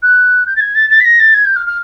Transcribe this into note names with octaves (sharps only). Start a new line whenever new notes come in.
F#6
G6
A6
G#6
A6
A6
B6
A#6
A6
G#6
G6
F6
F6